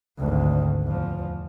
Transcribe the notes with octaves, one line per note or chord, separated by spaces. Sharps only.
G#1 D2
E2 F3